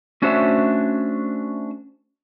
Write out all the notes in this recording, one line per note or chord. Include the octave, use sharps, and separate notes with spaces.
A3 C#4 D4 F#4 C5 E5